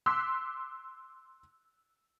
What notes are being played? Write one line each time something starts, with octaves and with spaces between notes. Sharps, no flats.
C6 D6 E6 F#6 B6